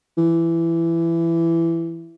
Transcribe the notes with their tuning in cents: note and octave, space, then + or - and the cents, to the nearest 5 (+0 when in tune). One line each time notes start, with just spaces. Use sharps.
E3 +15